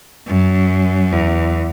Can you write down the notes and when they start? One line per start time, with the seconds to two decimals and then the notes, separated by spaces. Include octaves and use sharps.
0.27 F#2
1.12 E2